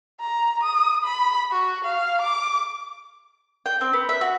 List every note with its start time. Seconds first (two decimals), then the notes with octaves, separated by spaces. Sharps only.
0.20 A#5
0.63 D#6
1.05 B5
1.52 F#4
1.85 F5
2.22 D6
3.66 G5
3.81 C4
3.93 B3
4.09 E5
4.21 F#4